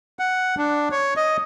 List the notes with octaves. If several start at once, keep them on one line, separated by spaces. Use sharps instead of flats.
F#5
D4
C#5
D#5